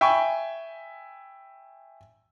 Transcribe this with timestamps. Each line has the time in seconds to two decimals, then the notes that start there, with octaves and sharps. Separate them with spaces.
0.01 E5 G5 G#5 B5 C#6